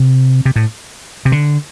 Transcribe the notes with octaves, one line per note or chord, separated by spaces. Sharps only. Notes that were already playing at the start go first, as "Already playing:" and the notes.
Already playing: C3
C3
A2
C3
D3